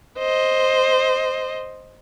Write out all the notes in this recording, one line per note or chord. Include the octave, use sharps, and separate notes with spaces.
C5 D#5